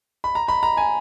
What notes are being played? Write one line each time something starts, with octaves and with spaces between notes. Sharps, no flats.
B5
A#5
B5
A#5
G#5